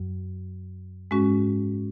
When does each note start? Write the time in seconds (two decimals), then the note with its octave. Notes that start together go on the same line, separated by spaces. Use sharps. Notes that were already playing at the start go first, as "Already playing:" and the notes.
Already playing: F#2 F#3
1.11 G#2 G#3 C#4 F#4